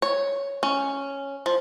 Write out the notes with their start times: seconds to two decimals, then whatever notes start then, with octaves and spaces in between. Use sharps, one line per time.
0.02 C#5
0.63 C#4
1.46 F3